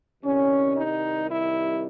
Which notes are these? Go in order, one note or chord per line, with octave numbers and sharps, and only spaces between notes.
C2 C3 D#3 G3 C#4
D#4
E4